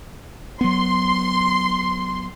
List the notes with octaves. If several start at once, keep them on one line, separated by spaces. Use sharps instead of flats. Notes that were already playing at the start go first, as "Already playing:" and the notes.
F#3 B3 C6